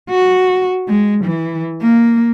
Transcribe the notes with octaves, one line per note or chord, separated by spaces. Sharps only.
F#4
G#3
E3
A#3